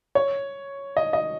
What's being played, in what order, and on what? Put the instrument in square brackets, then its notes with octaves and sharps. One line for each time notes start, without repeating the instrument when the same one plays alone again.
[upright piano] C#5
D#5
D#5